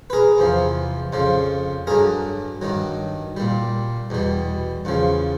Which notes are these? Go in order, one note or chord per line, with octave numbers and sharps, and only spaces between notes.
B4
G#4 A#4
E2 C3 F3
F2 C#3 F3
G2 D3 F#3 G#4 A#4
G2 D#3 F#3
A#2 G3
E2 B2 G3
E2 C#3 F3